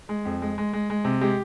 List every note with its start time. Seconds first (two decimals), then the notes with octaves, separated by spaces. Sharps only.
0.09 G#3
0.25 F2
0.42 G#3
0.58 G#3
0.73 G#3
0.90 G#3
1.05 C3
1.21 G#3 G4